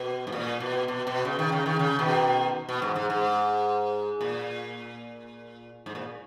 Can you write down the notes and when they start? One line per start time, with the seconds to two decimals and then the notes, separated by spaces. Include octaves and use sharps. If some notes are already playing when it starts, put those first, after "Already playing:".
Already playing: B2
0.27 G#2
0.32 A#2
0.60 B2
0.88 B2
1.07 B2
1.25 C#3
1.39 D#3
1.52 C#3
1.66 D#3
1.79 C#3
1.99 B2 D#3
2.69 B2
2.82 G#2
2.96 G#2
3.10 G#2
4.21 A#2
5.86 G#2
5.95 A#2